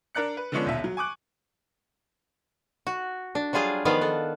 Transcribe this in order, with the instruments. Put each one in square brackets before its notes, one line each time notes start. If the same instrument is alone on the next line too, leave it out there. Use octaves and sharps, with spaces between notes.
[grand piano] D4 A#4 D5 F#6 C#7
B4
D3 F3 G#3 B3 C#4 D4
D#1 B1 E5
F#3
G#5 C#6 D6 F#6
[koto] F#4
D4
F#3 G3 F4 G#4 F5
D#3 F3 B3 D4 B4 F5
B3 A4